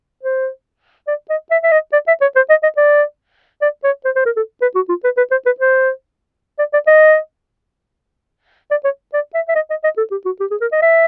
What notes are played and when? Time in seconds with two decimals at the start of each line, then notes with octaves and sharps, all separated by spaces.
0.23 C5
1.07 D5
1.30 D#5
1.51 E5
1.63 E5
1.71 D#5
1.92 D5
2.07 E5
2.21 C#5
2.35 C5
2.49 D#5
2.63 D#5
2.77 D5
3.61 D5
3.84 C#5
4.05 C5
4.16 C5
4.25 A#4
4.36 A4
4.62 B4
4.75 F#4
4.89 F4
5.04 B4
5.17 B4
5.31 C5
5.46 B4
5.60 C5
6.58 D5
6.73 D5
6.87 D#5
8.71 D5
8.84 C#5
9.13 D5
9.34 E5
9.48 E5
9.55 D#5
9.70 D#5
9.84 D#5
9.97 A4
10.11 G4
10.25 F#4
10.40 G4
10.51 G#4
10.61 A#4
10.72 D#5
10.82 E5